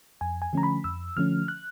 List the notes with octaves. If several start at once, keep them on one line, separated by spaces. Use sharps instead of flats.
F2 G#5
G#5
D3 F3 A3 C#4 A#5
B5
F2 E6
D3 F3 A3 C#4 F6
F#6